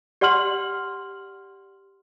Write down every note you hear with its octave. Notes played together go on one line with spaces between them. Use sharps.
G4 D5 F#5 C6 F6 F#7